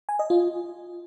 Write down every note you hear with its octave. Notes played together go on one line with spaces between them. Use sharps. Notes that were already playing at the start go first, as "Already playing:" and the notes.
G#5
D#5
F4